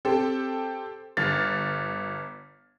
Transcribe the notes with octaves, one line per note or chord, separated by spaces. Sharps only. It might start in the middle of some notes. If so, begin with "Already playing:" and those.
C4 G4 A4
G1 F6 A6